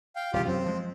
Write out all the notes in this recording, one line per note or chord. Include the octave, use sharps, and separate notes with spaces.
F5 G5
E1 C2 D#3 F4 G4
F#2 C3 F#3 C4
F3 G#3